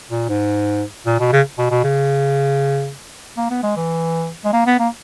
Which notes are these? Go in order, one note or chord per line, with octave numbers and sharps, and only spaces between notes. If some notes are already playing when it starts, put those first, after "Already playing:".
A#2
G#2
A#2
B2
C#3
B2
B2
C#3
A#3
B3
G#3
E3
G#3
A#3
B3
A#3